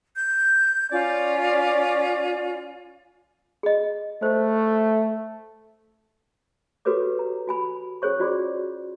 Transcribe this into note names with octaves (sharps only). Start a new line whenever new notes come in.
G6
C#4 F4 D5
G#4 D#5
A3 C5
F#4 G4 A4 B4 C#5 D6
A#5
F#4 G#5 B5
C#4 G#4 C5 C#5 C#6
F4 F#4 D5 C6 D6